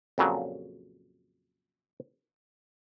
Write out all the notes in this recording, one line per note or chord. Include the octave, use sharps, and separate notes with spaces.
F2 A#2 C#3 F#3